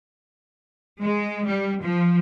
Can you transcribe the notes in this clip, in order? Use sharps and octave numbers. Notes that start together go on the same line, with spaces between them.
G#3
G3
F3